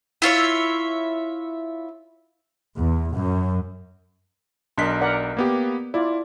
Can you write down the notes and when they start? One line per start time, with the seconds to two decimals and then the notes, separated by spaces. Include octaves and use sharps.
0.22 E4 F4 C#5 E5
2.78 E2
3.15 F#2
4.78 B1 D4 A#4 D#5 C6 B6
5.01 A#4 D5 F#5
5.37 A#3 B3 G4
5.94 E4 F4 D5